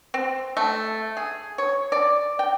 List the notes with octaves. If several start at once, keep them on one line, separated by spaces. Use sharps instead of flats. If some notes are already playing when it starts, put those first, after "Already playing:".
C4
A3
G#4
C#5
D5
G5